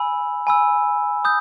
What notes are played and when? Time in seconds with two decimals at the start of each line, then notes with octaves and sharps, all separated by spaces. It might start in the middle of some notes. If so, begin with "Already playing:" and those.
Already playing: G#5 B5 E6
0.47 G#5 B5 E6
1.25 D#6 G6